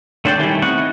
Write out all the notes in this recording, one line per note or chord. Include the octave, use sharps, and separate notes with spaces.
A3 D4 C5 D5 G5
D#3 G3 A3 C#4 E4
B3 C4 F#5 C#6 F#6
D#5